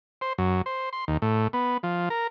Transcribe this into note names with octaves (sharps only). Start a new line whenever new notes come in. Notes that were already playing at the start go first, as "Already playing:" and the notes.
C5
F#2
C5
C6
D#2
A2
B3
F3
A#4